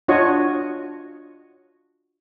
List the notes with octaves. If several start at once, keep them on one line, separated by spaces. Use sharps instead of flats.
D4 F4 F#4 C#5 D#5 C#6